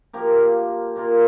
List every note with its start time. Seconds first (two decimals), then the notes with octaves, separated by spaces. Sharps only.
0.13 F3 A#3 G4 A#4
0.96 A#2 A#3 F4